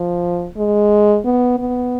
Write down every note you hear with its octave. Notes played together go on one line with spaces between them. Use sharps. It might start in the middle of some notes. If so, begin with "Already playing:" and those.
Already playing: F3
G#3
B3
B3